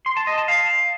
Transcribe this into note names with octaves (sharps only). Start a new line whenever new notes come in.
C6
A5
D#5
A5
F5